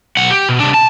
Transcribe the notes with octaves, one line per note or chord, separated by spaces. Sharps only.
B1 F#5
G4
B2
C3 D4
A5